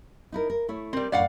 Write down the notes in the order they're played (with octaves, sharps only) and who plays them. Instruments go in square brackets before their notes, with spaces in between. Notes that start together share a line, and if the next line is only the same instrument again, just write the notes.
[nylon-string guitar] D#4 E4 A#4
A#4
A3 E4 C#5
[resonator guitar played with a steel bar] G3 C4 [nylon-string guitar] A#4 D5
[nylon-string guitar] F#2 A2 C#4 [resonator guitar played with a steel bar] D5 F5 F#5